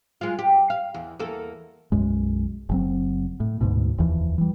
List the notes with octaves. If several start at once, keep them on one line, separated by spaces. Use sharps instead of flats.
G#3 F4
G4
F5
E2
E2 A#3 A4
B1 F#2 G#3
F#1 F#3 C4
A2
D2 G#2 B2
F1 D#2 E3 F3
E3 G3